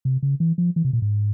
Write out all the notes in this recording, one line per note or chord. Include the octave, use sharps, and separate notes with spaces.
C3
C#3
E3
F3
E3
C3
A#2
G#2